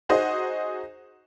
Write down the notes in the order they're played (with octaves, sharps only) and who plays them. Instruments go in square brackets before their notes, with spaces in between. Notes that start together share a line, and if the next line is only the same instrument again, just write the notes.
[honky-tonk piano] D#4 F#4 G#4 C5 D#5